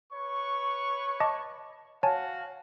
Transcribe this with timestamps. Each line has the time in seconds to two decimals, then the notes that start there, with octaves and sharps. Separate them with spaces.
0.12 B4 C#5 C#6
1.20 D#5 A5 D6
2.03 F#4 C#5 F5 F#5 G#5 A5